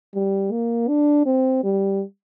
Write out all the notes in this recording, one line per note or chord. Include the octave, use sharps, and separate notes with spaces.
G3
A#3
D4
C4
G3